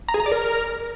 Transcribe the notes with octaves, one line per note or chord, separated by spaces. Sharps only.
A#5
G#4
A#5
D5
A#4